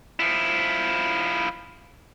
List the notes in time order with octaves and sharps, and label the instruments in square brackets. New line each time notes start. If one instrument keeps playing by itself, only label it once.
[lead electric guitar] F3 E4